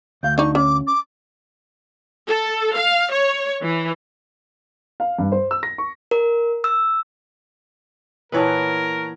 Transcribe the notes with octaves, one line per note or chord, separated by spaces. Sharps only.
D2 F5 G6
D4 D#4 C#6
C#4 D6
D6
A4
F5
C#5
E3
F5
G2
C5
E6
A#6
C#6
A#4
E6
A#2 E3 B3 A#4 B4 C#5 A5